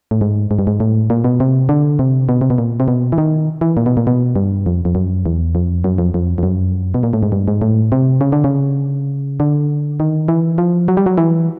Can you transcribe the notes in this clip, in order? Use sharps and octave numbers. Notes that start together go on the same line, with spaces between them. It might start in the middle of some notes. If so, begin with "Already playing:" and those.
A2
G#2
G#2
G2
G#2
A2
A#2
B2
C3
D3
C3
B2
C3
B2
A#2
C3
B2
E3
D#3
E3
A#2
B2
A#2
B2
G2
F2
F2
F#2
E2
F2
F#2
F2
F2
F2
F#2
B2
A#2
A2
G#2
G2
G#2
A2
C3
C#3
D3
C#3
D3
D#3
E3
F3
F#3
G3
F#3
E3